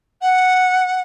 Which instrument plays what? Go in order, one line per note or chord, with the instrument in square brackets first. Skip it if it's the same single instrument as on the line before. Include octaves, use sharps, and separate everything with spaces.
[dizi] F#5